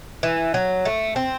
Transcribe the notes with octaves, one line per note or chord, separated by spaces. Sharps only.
E3
F#3
A3
C4